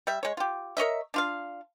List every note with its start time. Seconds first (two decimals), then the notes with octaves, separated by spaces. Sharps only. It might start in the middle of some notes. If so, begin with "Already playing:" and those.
0.07 G3 E5
0.23 G#3 C#5
0.37 F4 G4
0.77 A#4 C#5 D#5 E5
1.14 D4 F4 F5